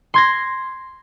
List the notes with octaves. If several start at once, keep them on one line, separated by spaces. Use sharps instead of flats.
C6 G#6 A#6